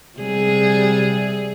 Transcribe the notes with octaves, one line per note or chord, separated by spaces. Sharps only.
C3 G3 G#4